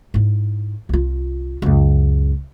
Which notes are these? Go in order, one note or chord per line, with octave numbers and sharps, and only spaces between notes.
G#2 E4
C2 F4
C#2 F#2